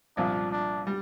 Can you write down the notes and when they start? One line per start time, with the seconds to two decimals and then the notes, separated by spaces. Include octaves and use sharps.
0.17 C2 A#2 F3 D4
0.52 D4
0.87 G3